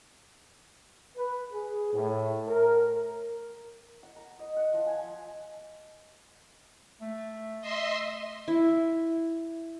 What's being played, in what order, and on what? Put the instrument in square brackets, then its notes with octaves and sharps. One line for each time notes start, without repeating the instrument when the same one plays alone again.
[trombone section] B4
G#4
A2
A#4
[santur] F#5
A#5
D#5
F#5
F3
G#5
[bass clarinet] A3
[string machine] D#5 E5 C6
[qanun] E4